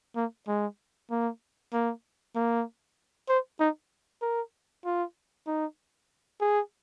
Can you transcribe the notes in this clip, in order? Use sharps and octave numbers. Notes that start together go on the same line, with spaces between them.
A#3
G#3
A#3
A#3
A#3
C5
D#4
A#4
F4
D#4
G#4